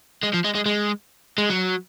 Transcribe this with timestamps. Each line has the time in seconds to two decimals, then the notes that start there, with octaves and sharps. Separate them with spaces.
0.24 G#3
0.34 F3
0.45 G#3
0.55 G#3
0.66 G#3
1.38 G#3
1.49 F#3